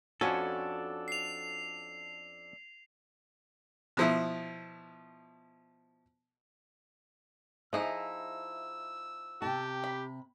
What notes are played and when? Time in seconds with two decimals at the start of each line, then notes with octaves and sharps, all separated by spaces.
0.21 F2 C#4 D4 F#4 A4 G#5
1.08 C7 F7
3.97 B2 F3 E4
7.73 F3 D#4 E4 G#4 E5 E6
9.42 C3 G4 A5
9.84 B5